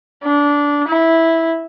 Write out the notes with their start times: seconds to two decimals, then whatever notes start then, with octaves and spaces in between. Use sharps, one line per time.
0.24 D4
0.88 E4